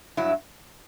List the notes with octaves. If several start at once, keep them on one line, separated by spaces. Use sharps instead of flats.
G2 F#3 E4